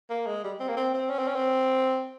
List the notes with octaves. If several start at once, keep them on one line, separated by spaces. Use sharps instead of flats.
A#3
G#3
G3
C4
A#3
C4
C4
C#4
C4
C#4
C4